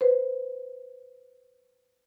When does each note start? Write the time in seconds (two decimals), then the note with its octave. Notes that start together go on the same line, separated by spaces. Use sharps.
0.01 B4 C5